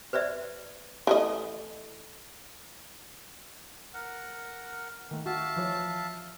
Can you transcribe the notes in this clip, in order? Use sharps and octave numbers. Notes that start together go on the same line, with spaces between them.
B4 C5 D5 E5
E3 A3 D#5
A#4 F#5
D#3 A3
F#4 E5 F5 A5
E3 F3 C#5